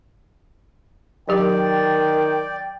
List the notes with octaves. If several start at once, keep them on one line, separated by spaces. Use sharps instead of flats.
D#3 F#3 G4 D5 G5